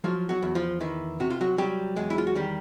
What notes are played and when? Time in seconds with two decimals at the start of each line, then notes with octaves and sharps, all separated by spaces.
0.04 F3 F#3 F4
0.29 F#3 F#4
0.43 E2
0.55 F3 F4
0.81 D#3 E3 E4
1.20 C3 F#4
1.30 F4
1.41 F#3 F#4
1.58 F#3 G3 G4
1.96 E2 G#3 G#4
2.10 E4
2.18 F4
2.27 F#4
2.35 D#3 G3 G4